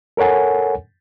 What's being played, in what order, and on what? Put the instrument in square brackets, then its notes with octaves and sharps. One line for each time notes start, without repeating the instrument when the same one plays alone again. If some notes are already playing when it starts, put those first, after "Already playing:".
[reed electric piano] A4 A#4 C#5 F#5 G#5